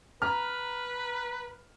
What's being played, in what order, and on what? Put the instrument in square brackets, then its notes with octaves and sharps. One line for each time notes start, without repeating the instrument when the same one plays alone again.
[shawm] B4 [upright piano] A#5 F6